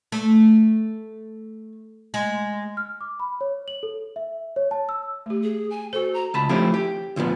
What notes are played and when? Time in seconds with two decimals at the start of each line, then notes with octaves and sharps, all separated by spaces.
0.12 A3
2.14 G#3
2.77 F6
3.01 D6
3.20 B5
3.41 C#5
3.68 F#7
3.83 A4
4.16 E5
4.56 C#5
4.71 A5
4.89 E6
5.26 A3 G4
5.43 G#4
5.70 G#5
5.93 F#4 A4 C5
6.14 A#5
6.34 C#2 A5 B5
6.49 F3 A3 C4 C#4 E4 G4
6.74 G4
7.16 D2 A#2 F3 B3